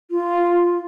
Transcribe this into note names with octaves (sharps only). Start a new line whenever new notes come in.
F4